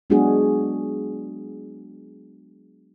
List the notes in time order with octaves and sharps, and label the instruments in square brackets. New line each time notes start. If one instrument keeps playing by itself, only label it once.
[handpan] F#3 G#3 B3 D4 F#4 G#4